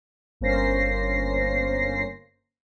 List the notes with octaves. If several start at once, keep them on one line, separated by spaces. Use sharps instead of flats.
G1 A#3 C#4 C5 A#6 C7